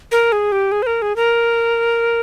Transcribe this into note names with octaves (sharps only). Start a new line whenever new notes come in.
A#4
G#4
G4
G#4
C5
A#4
G#4
A#4